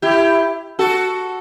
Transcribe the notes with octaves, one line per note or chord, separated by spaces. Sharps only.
E4 G4
F#4 A4